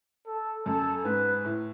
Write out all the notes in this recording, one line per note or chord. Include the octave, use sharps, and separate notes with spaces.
A4
F#2 A4
G#2 B4
A2